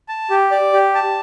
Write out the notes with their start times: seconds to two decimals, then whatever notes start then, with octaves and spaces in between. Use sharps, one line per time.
0.09 A5
0.30 G4
0.51 D5
0.73 G4
0.95 A5